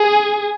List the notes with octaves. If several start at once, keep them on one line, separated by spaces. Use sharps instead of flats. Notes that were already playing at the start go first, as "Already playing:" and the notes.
Already playing: G#4